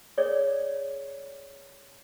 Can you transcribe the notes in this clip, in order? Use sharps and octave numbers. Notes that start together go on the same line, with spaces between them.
G#4 C#5 D5